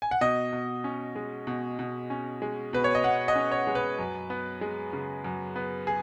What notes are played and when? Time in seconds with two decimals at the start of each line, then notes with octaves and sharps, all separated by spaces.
0.02 G#5
0.11 F#5
0.21 B2 D#5
0.53 B2
0.84 C#4
1.16 G#3
1.47 B2
1.79 B2
2.10 C#4
2.42 G#3
2.73 B2 B4
2.84 C#5
2.95 D#5
3.04 B2 F#5
3.28 D#5
3.36 C#4
3.51 C#5
3.67 G#3
3.75 B4
3.99 F#2
4.30 B3
4.61 G#3
4.93 C#3
5.24 F#2
5.56 B3
5.87 G#4